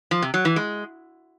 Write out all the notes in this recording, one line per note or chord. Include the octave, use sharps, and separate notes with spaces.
F3
C3
F#3
E3
G#3